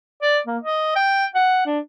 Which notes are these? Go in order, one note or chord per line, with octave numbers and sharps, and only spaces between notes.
D5
A#3
D#5
G5
F#5
D4